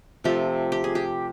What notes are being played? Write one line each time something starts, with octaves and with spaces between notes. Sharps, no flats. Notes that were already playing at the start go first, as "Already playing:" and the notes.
C3 F3 A3 G4
G4
G#4
G4